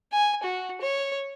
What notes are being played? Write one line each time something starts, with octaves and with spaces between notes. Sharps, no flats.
G#5
F#4
C#5